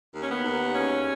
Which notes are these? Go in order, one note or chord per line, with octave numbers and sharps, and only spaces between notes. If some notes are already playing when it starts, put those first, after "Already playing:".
D#2
C#4
B3
D#2
E2 C#4